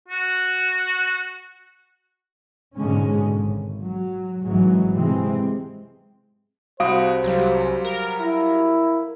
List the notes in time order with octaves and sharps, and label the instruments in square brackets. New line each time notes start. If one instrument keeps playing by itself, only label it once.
[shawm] F#4
[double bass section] G#2 B2 D3 G#3 C#4
G#1
F#3
G#1 G#2 E3 F#3 G#3
C3 E3 G#3 C4
[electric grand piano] C2 F#4 D#6 [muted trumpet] C5 [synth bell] F5
[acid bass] C2 [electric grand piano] F#3 G3
[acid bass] A#4
[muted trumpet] E4